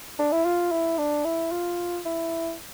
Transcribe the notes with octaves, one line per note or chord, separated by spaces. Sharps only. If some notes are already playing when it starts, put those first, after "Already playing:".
D4
E4
F4
E4
D4
E4
F4
E4